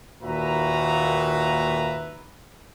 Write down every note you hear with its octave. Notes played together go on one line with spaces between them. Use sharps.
D#2 A#2 F#4 B4 E5 A#5